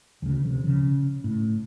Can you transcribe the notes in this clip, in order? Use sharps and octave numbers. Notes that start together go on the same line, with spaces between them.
D2 C#3
C3 F3
C#3
A2